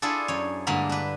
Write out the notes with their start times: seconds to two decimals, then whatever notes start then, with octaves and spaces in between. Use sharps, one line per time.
0.02 D4 E4 F4 G#4 A4
0.28 F#2 C#5
0.67 G2 D3 G#3 A#3 A#4 B5
0.89 D4 B4